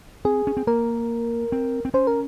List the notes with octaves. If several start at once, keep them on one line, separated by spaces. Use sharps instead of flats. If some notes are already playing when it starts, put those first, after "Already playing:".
C4 G#4
C#4
C4
A#3 A#4
C4
C4
C#4 C5
A#4